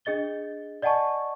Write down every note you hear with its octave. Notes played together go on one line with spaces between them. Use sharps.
D4 G#4 D#5 A6 G7
D5 D#5 F#5 G#5 A5 C#6